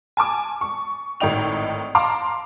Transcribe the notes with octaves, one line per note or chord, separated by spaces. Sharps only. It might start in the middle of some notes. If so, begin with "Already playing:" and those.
G#5 A5 D6
C#6
G#1 A2 D#4 D#5 G5 F7
F5 A5 A#5 C6 D6